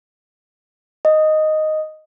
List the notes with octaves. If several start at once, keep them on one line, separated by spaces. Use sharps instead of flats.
D#5